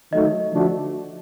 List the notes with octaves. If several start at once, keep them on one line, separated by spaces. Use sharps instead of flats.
D#3 F#3 A3 D#5
D3 F3 A3 D4 F#4